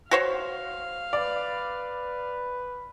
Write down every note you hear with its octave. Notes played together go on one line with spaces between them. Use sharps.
F#4 C5 C#5 F5
B4 D5